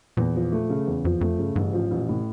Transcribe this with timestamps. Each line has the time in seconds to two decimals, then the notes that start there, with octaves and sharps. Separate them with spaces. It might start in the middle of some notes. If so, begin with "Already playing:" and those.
0.17 E2 A#2
0.35 F3
0.52 A3
0.69 C#3
0.87 E2
1.05 F2 F3
1.21 F2 A3
1.39 G2 C#3
1.56 A1 G2
1.73 G#2 F3
1.91 A1 A#2
2.08 A2 C3